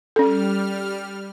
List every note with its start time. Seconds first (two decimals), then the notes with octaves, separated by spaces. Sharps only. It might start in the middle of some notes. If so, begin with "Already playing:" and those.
0.16 G3 C#4 A4 F6